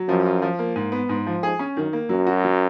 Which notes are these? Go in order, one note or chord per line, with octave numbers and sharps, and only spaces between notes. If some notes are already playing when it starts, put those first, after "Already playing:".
Already playing: F#3
F#2 F3
F4
F3
A#3
G#2
B3
G#2
F3
G#2 G#4
C#4
F#2 D#3
A#3
F#2 F#3
F#4
F#3